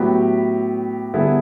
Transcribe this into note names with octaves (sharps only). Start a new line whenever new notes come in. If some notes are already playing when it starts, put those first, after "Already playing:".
Already playing: A2 F#3 B3 E4 G4
D3 G3 B3 E4 G#4